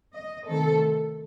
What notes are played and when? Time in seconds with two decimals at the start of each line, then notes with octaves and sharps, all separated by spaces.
0.13 D#5
0.46 C3 D#3 A3 C4 A4